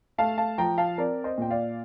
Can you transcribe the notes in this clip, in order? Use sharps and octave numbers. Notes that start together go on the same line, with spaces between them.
A3 F5 A5
F5 A5
F3 G5 A#5
F5 A5
C4 A#4 D5
C5 D#5
A#2 G5
D5 F5